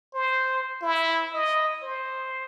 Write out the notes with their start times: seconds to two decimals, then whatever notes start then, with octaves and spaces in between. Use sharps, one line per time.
0.14 C5
0.82 E4
1.34 D#5
1.82 C5